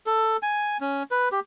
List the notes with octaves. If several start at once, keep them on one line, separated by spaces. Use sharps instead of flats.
A4
G#5
C#4
B4
G4